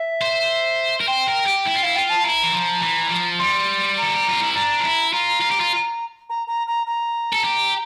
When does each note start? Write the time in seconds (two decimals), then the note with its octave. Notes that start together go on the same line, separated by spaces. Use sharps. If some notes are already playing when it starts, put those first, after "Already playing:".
Already playing: E5
0.21 C5
1.00 A#4
1.07 C5 G5
1.28 A#4
1.46 G4
1.66 E4
1.75 F4
1.83 E4 F5
1.95 F4 G5
2.10 A5
2.24 E4 A#5
2.43 E3
2.53 F3
2.82 E3
3.07 G3
3.11 F3
3.39 G3 C6
3.97 A#5
4.03 A4
4.16 G4
4.29 F4
4.43 E4
4.55 D4 A#5
4.80 F4
4.85 E4
5.13 F4 A#5
5.42 F4
5.51 G4
5.61 F4
6.29 A#5
6.48 A#5
6.67 A#5
6.87 A#5
7.33 A4
7.44 G4